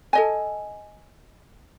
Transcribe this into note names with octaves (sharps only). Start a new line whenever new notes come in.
A4 D#5 G#5